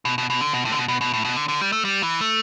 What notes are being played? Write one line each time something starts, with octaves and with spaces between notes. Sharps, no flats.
B2
B2
B2
D3
B2
A2
D3
B2
B2
B2
A2
B2
D3
D3
G3
A3
G3
E3
A3